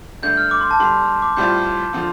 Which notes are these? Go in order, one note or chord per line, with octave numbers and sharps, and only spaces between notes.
G2 D3 A3 D4 G6
F6
D6
C6
A5
D3 G3 D4 C6
D6
A2 G3 C4 F4 G6
D3 F3 C4 F4